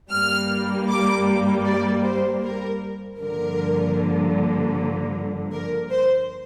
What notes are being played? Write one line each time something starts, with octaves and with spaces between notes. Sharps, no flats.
G2 G3 A#3 F6
D6
D5
C5
A#4
G2 D3 F3 A#3 A#4
A#4
C5